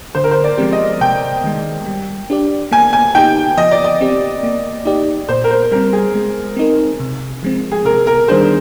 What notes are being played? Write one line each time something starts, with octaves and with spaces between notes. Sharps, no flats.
D3 C5
A#4
C5
D5
F3 G#3 C4 G4
D#5
C3 G5
D#3 G#3
G3
D4 G4 D5
A#3 G#5
G#5
D#4 G4 G5
F3 D#5
D5
D#5
C4 G4
A#3
D#4 G4 D5
A#2 C5
A#4
C5
G3 C4 A#4
G#4
G#3
C4 D#4 A#4
C3
F3 G#3 C4
G#4
C3 A#4
A#4
D#3 G3 D4 G#4 C5